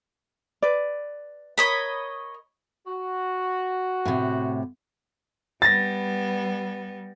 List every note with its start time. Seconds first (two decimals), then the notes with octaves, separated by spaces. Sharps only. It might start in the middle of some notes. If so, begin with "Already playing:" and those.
0.62 B4 D5
1.58 A#4 C#5 D#5 B5
2.86 F#4
4.05 A2 C3
5.62 G3 B3 A6 A#6